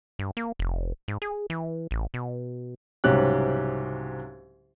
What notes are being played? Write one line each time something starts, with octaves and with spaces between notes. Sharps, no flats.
G2
A#3
F1
G#2
G#4
E3
A1
B2
C2 G#2 C#3 F#3 G4 F#6